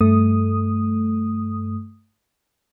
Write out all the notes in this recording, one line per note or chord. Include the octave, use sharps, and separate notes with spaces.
G2 A3 D#6